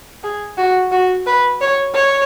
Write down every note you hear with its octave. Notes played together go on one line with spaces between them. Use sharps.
G#4
F#4
F#4
B4
C#5
C#5